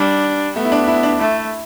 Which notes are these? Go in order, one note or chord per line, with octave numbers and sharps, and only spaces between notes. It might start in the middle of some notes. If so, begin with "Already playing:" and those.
Already playing: G3 D4
A3 B3
E4
D4
E4
D4
A3 E4